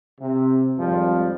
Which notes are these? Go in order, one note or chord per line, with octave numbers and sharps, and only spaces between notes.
C3
G#1 F2 F3 G3